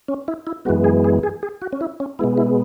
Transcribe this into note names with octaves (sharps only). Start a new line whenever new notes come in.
C#4
E4
E4
F#2 E3 G#3 B3 F#4
G#4
G#4
G#4
G#4
F#4
C#4
E4
C#4
B2 G#3 B3 E4
E4